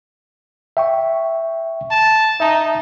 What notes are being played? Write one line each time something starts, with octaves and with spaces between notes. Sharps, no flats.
E5 G5 C#6
A5
D#4 E5 A5 A#5